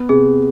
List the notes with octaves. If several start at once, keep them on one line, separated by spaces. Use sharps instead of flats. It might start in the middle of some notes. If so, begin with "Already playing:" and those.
Already playing: B3
C3 G#4